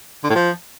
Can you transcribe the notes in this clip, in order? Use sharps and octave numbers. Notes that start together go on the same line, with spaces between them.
D3
A2
F3